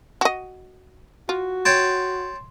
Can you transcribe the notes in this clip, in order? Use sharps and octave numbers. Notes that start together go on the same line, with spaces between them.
F#4 D#5
F4 F#4
C#5 G5 A5 C6